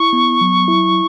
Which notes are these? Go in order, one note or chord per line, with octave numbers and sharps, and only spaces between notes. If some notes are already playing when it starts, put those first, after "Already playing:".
Already playing: E4 C#6
B3
F#3
E4